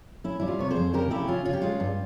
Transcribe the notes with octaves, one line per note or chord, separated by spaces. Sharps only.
C#4 E4
G3 E4
F4
C3 C#5
G#4 C5
F2
C#3 G4 A#4
C#3 E4 G4
C#4 F4
C#4 F4
G4
G#3 F4
G2